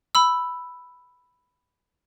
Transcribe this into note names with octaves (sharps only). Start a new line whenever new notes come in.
B5 E6